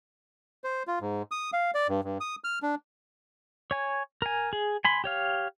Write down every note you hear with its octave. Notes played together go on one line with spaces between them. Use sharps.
C5
F4
G#2
D#6
F5
D5
G2
G2
D#6
F6
D4
C#5 G#5
A#4 G#5
G#4
G#5 B5 C6
G4 C#5 F5